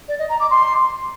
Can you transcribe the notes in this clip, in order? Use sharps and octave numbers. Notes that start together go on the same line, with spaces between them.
D5
D#5
A#5
D6
C6